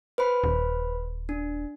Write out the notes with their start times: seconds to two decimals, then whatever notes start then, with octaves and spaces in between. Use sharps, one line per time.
0.18 B4 C5 B5
0.44 D#1
1.29 D4